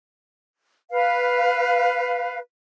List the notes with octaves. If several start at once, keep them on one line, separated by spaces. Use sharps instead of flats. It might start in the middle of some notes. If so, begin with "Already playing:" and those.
B4 F5